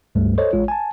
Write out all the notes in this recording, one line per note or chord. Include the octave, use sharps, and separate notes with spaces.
C#2 G2 G3 A3
A4 C5 C#5 D#5
A1 G#3 F4 C#5
G#5 A5